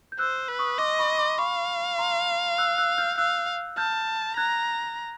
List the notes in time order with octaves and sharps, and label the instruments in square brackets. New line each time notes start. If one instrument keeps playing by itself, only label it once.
[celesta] G6
[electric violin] C5 [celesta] E6 F#6
[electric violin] B4
[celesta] C#6 D#6
[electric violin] D#5 [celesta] C6 D6
[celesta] B5 C#6
C6 D6
[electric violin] F5 [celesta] B5 C#6
[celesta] A#5 C6
E6 F#6
E6 F#6
F6 G6
[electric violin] F5 [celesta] E6 F#6
[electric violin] A5 [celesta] F6 G6
[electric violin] A#5 [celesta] F#6 G#6